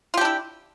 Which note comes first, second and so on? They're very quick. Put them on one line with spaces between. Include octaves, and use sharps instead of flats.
F4 G4 D4 E4